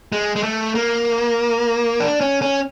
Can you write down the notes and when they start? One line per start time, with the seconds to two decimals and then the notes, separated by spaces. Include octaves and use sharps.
0.12 G#3
0.36 G#3
0.43 A3
0.75 A#3
2.00 D4
2.21 C#4
2.42 C#4